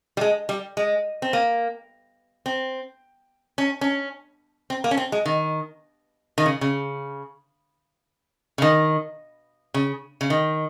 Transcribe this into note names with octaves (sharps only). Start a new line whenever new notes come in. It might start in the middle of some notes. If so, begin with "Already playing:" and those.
G3
G#3
G3
G#3
C4
A#3
C4
C#4
C#4
C4
A#3
C#4
C4
G#3
D#3
D#3
C#3
C#3
C#3
D#3
C#3
C#3
D#3